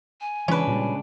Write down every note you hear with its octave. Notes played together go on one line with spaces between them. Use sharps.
G#5
G#2 C#3 E3 C#4 D4 B4
A#2 G3